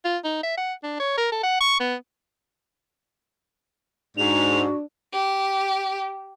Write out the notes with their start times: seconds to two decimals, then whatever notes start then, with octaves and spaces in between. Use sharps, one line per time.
0.05 F4
0.24 D#4
0.43 E5
0.57 F#5
0.83 D4
1.00 C#5
1.18 A#4
1.32 A4
1.43 F#5
1.61 C#6
1.80 B3
4.18 G#2 D4 F#4 F7
5.14 G4